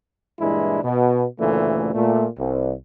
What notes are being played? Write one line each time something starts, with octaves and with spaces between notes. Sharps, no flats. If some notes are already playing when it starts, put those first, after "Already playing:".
G2 A#2 E3 G#3 D4 E4
B2
D2 A#2 C#3 E3 A3
A#2 A3
C2